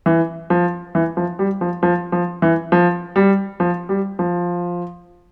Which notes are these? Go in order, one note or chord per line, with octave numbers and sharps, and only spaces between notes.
E3
F3
E3
F3
G3
F3
F3
F3
E3
F3
G3
F3
G3
F3